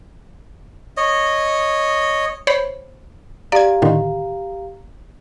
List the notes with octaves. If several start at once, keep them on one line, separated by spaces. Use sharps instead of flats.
C#5 D#5
C5 C#5 B5
G4 D5 F5 A#5 G#6
A2 D3 D#3